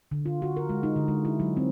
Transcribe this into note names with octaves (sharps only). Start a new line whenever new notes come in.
D3
F4
F#4
A#4
G#3
D#4
D3
G#3
E4
F#3
C4